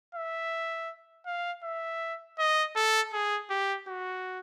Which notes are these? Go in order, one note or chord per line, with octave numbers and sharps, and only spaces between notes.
E5
F5
E5
D#5
A4
G#4
G4
F#4